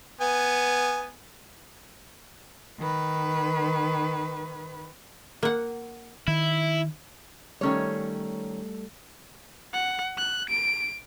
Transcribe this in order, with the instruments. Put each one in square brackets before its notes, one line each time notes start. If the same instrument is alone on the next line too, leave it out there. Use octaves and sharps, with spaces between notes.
[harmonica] B3 G#5
[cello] D#3 B4
[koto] A#3 F#5
[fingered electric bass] D#3 [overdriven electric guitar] E4
[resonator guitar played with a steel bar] D#3 C#4 C#5 [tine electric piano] G3 A3 A4
[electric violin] F#5
F#6
D7